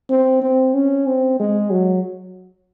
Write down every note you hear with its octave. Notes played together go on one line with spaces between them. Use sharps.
C4
C4
C#4
C4
G#3
F#3